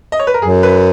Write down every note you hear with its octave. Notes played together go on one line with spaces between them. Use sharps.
D#5
C#5
B4
A#4
F#2 G#4
B4